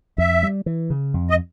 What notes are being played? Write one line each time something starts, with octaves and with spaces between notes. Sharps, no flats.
F2 E5
G3
E3
C#3
F2
D#5